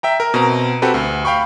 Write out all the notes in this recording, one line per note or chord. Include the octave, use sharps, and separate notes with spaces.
E5 G5 A#5
A#4
B2 C4 A#5
C4 F#4 G4 A4 B4
D2
F5 G5 B5 C#6